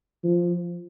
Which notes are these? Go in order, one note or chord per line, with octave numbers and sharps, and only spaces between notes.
F3